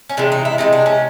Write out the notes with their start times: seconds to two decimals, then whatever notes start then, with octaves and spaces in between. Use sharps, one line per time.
0.09 C#4
0.17 C3 E3 G#3 D4
0.32 D#4
0.45 E4
0.58 C3 E3 G#3 D#4
0.73 D4
0.86 C#4